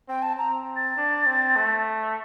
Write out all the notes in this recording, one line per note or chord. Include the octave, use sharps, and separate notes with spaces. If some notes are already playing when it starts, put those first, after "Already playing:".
C4 G5
A5
C4 A#5
A6
D4
C4
A3